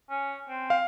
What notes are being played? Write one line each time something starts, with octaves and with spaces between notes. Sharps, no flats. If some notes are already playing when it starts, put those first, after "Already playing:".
C#4
C4
F5